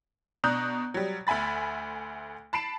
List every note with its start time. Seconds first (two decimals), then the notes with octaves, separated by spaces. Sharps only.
0.44 B2 D4 A#5 D#6 F#6 G6
0.94 F#3 G3
1.27 D2 E5 G#5 B5 A6
2.53 A5 B5 C7 D7 E7